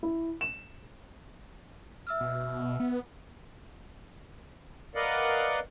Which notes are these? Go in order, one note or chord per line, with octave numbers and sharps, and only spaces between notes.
E4
E7
E5 E6 F6
B2
B3
A#4 B4 D5 D#5 F5 F#5